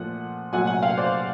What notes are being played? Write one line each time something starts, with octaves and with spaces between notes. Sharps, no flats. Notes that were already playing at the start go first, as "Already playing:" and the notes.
Already playing: A#2 F3 A3 F#5
A#2 F#3 A3 F#5 G#5
F#5 G#5
F5 G5
C5 D5